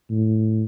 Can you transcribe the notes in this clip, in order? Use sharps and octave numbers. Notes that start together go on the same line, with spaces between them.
A2